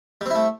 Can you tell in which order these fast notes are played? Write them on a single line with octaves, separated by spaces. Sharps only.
G3 C4 E4 A3